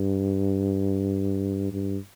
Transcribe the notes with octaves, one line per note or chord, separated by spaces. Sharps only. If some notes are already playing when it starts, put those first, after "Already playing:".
Already playing: G2
G2